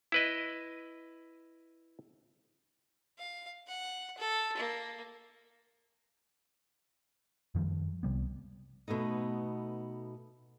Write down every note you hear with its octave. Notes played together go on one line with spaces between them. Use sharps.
E4 B4 D#5
F5
F#5
A4
A#3
F#2 D#3 F3 G3
C2 C3 G3 B3
B2 A3 B3 D#4